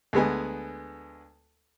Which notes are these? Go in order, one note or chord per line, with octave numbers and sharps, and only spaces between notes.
D2 G#3 B3 G#5